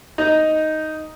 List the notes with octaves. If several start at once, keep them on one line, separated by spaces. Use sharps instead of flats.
D#4